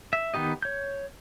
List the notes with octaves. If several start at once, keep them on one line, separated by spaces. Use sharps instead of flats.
E5
D#3 B3 D#4 G4 D#5
C#5 G6